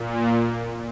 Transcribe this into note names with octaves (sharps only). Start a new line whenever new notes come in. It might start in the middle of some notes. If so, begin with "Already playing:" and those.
Already playing: A#2